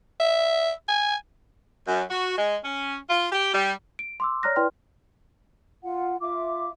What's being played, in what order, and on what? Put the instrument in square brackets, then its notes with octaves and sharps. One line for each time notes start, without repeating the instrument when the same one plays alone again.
[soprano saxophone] E5
G#5
[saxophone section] F#2
F#4
G#3
C#4
F4
G4
G3
[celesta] D7
C6 D6 E6
C#5 D5 A#5 F6 F#6 A#6
E4 B4 D5 G5 C6 F6
[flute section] F4 F#5
F4 E5 D6